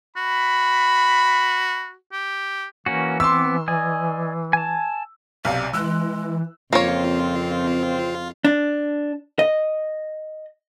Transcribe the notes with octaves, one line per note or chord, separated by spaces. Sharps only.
F#4 B5
G4
E3 A#3 C#4 F#4
B3 C4 C6 D6 E6
D5 D#5 G#5
G#5 A5
B1 C3 D5 F5
E3 G#3 E6 F#6
F2 C#3 E3 A#3 C4 F4 C#5
D4
D#5